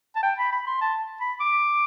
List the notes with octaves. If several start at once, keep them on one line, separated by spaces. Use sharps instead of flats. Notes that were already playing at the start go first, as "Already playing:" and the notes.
A5
G5
B5
B5
C6
A5
B5
D6